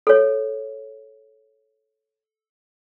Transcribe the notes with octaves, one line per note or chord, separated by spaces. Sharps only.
A4 C#5